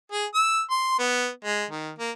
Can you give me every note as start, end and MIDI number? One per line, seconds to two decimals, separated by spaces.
0.12 0.26 68
0.34 0.61 88
0.70 0.97 84
0.99 1.28 59
1.45 1.64 56
1.71 1.91 51
1.99 2.11 58